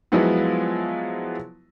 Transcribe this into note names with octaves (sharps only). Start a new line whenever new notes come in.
F3 F#3 G#3 B3 E4 F4